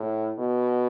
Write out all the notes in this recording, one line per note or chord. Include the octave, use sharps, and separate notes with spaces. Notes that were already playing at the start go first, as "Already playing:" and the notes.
Already playing: A2
B2